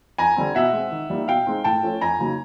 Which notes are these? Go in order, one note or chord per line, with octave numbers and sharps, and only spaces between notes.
F2 G#5 A#5
D3 G3 C4
B2 E5 F#5
G#3 C4
D#3
G3 A#3 D#4
B2 F5 G5
G#3 C4 D#4
A2 G5 A5
F3 A3 C#4
F2 G#5 A#5
C#3 F#3 A#3 D#4